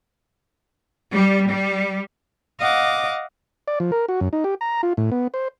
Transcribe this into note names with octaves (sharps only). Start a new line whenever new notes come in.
G3
G3
D#5 F5 F#5 D6
D5
F3
A#4
F#4
F#2
D#4
G4
A#5
F4
A2
B3
C5